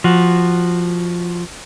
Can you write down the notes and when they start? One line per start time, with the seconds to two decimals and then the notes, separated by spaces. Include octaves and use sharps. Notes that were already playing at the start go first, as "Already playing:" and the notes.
0.04 F3 F#4